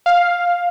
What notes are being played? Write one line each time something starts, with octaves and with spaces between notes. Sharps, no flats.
F5